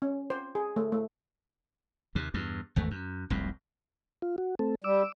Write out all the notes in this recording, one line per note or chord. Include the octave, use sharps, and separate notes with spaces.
C#4
C5
G#4
A3
A3
D#2 C3
E2 G2
G#1 E2 A3
F#2
F1 C2 F2 G#2
F4
F#4
A3 C4 A4
G3 D6 E6